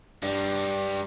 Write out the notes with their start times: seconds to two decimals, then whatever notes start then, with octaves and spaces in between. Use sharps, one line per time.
0.22 G2 G3